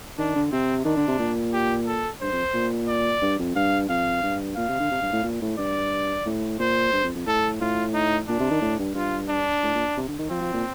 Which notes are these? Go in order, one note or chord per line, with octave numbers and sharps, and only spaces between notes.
D#3 D4
D3
C3 C4
D#3 D4
D3
C3
A#2
G4
A4
G2 C5
F2
A#2
D5
G2
F2
G2 F5
F2 F5
G2
A#2 F5
C3
D3
C3
G2
A2
A#2
A2
G2 D5
A2
A#2 C5
G2
F2
F2
A2 A4
A2 F4
D#4
A#2 D4
C3
D#3
A2
G2
G2 F4
D4
A2
A#2
C3
D3
D#3
F3 C4
F3
A#2